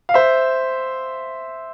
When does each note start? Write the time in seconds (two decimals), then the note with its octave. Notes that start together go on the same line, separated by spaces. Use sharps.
0.09 F5
0.14 C5 E5